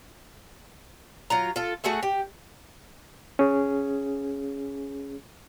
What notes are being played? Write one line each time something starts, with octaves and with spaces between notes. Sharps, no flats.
F#3 F4 A#5
F4 A4
A3 F#4 G#4 E5
G4
C#4 G#4